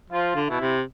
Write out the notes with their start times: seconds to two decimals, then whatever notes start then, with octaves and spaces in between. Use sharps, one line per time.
0.10 F3 F4
0.35 D3
0.48 B2 E4
0.61 C3